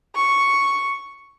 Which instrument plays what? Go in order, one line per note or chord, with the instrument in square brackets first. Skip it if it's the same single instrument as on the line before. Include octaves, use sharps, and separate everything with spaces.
[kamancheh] C#6